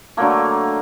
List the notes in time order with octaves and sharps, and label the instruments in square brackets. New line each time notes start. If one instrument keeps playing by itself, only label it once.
[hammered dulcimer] D3 F#3 A3 A#3